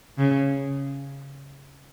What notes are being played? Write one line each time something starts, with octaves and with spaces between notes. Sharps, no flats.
C#3